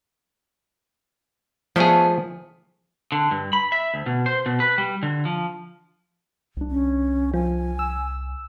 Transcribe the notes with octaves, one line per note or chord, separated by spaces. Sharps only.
F3 A3 B3 G#4 C#5
D3
G2
B5
E5
D2
B2
C5
B2
B4
G3
D3
F3
C2 D4
C#4
F3 G#5
E6